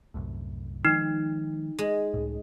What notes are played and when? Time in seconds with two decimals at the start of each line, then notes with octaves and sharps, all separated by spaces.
0.14 C2 F#2 A2
0.85 D#3 F3 G#3 D#4
1.79 G#3
2.14 C#2 A2